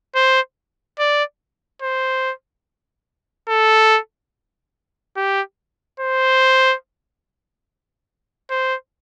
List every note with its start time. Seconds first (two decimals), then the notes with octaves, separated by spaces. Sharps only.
0.15 C5
0.99 D5
1.82 C5
3.49 A4
5.16 G4
6.00 C5
8.51 C5